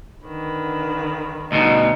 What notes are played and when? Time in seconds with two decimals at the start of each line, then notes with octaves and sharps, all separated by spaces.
0.24 D3 D#3 B4
1.52 D2 B2 D#4